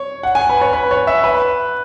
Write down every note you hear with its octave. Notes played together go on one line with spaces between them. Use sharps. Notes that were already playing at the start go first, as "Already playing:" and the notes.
Already playing: C#5
F#5
G#5
B4
C#5
B4
C#5
E5
B4